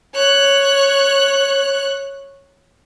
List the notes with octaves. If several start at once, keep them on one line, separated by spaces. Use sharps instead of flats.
C#5 F#6